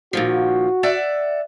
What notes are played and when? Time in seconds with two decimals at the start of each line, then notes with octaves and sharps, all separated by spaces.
0.13 A#2 D#3 F3 F#4
0.83 D5 E5 F#5